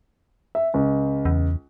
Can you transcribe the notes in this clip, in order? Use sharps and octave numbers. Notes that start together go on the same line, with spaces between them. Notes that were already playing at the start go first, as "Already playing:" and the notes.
E5
C#2
E2